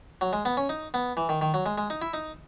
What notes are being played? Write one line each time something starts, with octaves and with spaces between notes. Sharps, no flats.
F#3
G#3
B3
C#4
D#4
B3
E3
D#3
D#3
F#3
G#3
G#3
D#4
E4
D#4